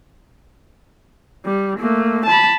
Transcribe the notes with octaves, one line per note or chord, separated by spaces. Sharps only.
G3
A3 A#3
A5 B5